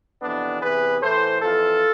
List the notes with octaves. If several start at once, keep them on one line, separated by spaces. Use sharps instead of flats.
F2 C3 E3 B3 D4
E2 C3 E3 G#4 B4
A2 E3 A4 C5
F2 E3 F4 A4